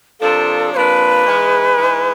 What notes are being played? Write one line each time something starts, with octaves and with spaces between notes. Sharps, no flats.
C3 F3 A#3 D4 A4
C3 F3 A#3 D4 B4 C#5
G#2 E3 G#3
G#2 E3 G#3